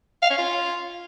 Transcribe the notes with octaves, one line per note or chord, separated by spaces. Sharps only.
F5
C#4
F4